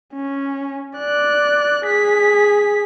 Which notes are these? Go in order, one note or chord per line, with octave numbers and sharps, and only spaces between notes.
C#4
D5 F#6
G#4 B6